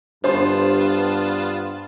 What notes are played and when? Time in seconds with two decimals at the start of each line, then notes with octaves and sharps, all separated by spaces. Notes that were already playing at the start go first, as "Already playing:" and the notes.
0.24 G2 D3 B3 F4 C5 A5 C6